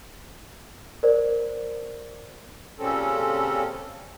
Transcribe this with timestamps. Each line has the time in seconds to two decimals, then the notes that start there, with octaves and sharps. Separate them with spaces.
1.03 A#4 C5 D5
2.79 A#2 C#3 G3 C4 C#4 A4